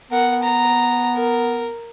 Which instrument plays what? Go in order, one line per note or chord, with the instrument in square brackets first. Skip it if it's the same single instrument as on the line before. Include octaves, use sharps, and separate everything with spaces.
[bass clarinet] B3 [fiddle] A#4 F#5
[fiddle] A#5
A#4